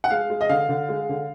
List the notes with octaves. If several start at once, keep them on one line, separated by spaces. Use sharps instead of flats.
F#5
G#3 F5
G#3
D#5
D3 F5
D3
G#3
D3